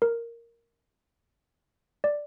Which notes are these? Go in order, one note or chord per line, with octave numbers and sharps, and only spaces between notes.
A#4
D5